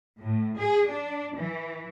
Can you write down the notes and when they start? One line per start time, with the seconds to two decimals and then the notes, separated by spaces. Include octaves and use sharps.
0.18 A2
0.58 G#4
0.87 D4
1.35 E3